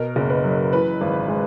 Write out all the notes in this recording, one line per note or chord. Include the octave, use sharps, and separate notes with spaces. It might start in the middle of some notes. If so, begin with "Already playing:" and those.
Already playing: B2 A#4
F#1
B4
F#3
E3 B4
G#1
G#3